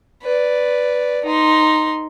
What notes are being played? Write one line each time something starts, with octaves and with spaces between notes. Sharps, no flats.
B4 D5
D#4 C6